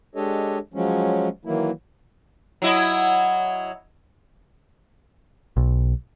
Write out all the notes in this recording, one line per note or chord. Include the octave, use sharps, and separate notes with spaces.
G#3 D4 G4 A4 C#5 D#5
F3 F#3 G#3 C#4
D#3 E3 F#3 A#3 E4
F#3 E4 D#5
B1